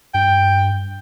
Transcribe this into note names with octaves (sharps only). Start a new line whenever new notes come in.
G2 G5